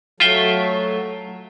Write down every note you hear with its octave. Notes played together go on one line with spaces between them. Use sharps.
F#3 A3 F4 E5 G5